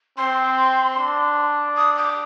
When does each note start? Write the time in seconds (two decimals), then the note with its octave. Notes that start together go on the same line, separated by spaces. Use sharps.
0.18 C4 C6
0.97 D4
1.77 D#6
1.96 D6